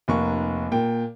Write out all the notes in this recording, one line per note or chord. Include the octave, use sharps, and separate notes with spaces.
F1 A#3 C#6
A#2 G5